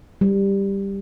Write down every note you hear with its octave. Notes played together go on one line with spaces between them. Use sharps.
G3